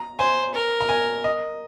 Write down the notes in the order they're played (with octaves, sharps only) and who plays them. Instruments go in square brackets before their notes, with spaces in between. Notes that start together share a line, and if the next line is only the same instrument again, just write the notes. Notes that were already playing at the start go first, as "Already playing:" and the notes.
Already playing: [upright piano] A#5
[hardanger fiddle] C5 [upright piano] G#5
[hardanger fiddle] A#4
[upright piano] A#5
G#5
D#5